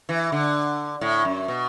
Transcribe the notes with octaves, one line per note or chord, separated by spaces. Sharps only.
E3
D3
A2
F#2
B2